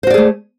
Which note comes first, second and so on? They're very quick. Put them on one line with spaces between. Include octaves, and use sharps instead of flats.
C5 F#4 D5 G#4 A3